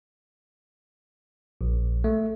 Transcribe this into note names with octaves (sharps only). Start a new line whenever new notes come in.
A#1
A3